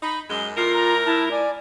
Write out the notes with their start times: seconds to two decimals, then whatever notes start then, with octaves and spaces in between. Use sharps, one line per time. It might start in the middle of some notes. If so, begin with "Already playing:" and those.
0.03 D#4 B5
0.30 F#2 G#3 G7
0.57 A2 F4 A#4 C7
0.74 A#5
1.06 E4 A5
1.31 D5 G#5